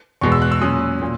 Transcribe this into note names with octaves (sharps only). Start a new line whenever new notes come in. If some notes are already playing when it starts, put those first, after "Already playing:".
E2 B2 G#3 C#6
E6
F#6
E6
A#2 F#3 C#4 D#6
A#2